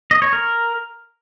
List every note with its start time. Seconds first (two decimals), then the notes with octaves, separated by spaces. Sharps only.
0.11 D#5
0.22 C#5
0.33 A#4